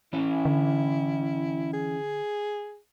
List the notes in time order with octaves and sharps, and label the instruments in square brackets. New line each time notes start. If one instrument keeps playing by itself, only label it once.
[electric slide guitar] E3 C#4 [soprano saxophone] E4
[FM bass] D3
[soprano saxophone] G#4